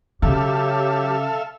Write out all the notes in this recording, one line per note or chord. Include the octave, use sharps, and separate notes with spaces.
C#3 F#3 G4 A4 E5 F5